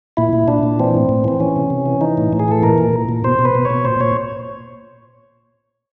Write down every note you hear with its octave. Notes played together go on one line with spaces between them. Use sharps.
A#2 E4
A#2
A#2 D4
A#2
E3 C4
A2
A2
E3 C4
E3 C#4
C3
C3
E3
E3 D#4
A2
A2
G#4
E3 A4
A#2 A#4
A#2
A#2
A#2
B2 C5
B2
B4
B2
C#5
B2
A#2 C5
A#2 C#5